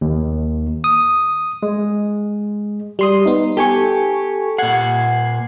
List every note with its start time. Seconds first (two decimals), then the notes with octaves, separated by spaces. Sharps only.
0.01 D#2
0.84 D#6
1.63 G#3
2.99 G3 C6 D#6
3.26 B3 D#4
3.57 G4 A4 G#5 C#6
4.58 A#2 F#5 G#6 C7